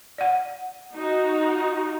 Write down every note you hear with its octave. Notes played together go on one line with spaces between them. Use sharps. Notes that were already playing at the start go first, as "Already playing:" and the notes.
D5 F#5
D#4 F#4